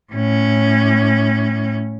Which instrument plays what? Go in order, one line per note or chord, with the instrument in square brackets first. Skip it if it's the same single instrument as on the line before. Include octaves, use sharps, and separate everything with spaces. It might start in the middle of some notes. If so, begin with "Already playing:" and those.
[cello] A2 C#4